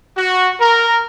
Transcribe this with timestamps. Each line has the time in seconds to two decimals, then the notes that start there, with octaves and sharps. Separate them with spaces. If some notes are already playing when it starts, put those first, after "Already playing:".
0.17 F#4
0.59 A#4